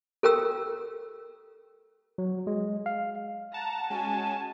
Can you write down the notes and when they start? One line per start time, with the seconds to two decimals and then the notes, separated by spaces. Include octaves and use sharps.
0.23 A4 A#4 G5 E6
2.18 F#3
2.47 G#3
2.86 F5
3.54 F#5 A5 A#5
3.90 G#3 C#4 F#4 G#5